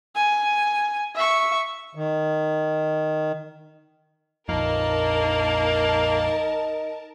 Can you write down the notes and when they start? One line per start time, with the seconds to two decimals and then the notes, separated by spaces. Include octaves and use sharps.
0.15 G#5
1.15 E5 C#6
1.95 D#3
4.49 A#1 F2 A#3 D#4 A#4 A5